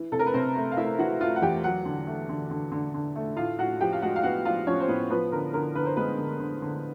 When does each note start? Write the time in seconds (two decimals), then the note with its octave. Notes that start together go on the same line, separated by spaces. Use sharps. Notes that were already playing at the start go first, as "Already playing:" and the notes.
Already playing: E3
0.12 C3 A4
0.19 A#4
0.26 B4
0.33 C3 C4 C5
0.56 A3
0.72 F5
0.77 A3 E4 E5
0.99 E3 F#4 F#5
1.21 A3 F4 F5
1.36 F#5
1.42 E2 G4 G5
1.64 F#3 F#4 F#5
1.85 D3
2.07 A3
2.29 D3
2.51 D3
2.72 D3
2.94 D3
3.16 A3
3.36 A2 F4 F5
3.59 A2 F#4 F#5
3.81 F3 G4 G5
3.93 F5
4.02 G#3 F#4 F#5
4.16 F5
4.23 B3 F#4 F#5
4.45 F3 F4 F5
4.67 F3 C#4 C#5
4.80 C5
4.88 A2 B3 B4
5.10 F3 B3 B4
5.32 D3 A#4
5.53 D3 A#4
5.75 D3 B4
5.86 C5
5.97 G#3 B3 B4
6.18 D3
6.40 D3
6.62 D3